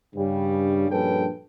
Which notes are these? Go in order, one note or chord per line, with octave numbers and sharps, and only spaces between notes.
G2 C#3 G3
A#1 G2 C#4 A4 B4 G5